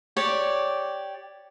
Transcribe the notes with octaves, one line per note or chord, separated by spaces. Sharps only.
G4 C#5 D5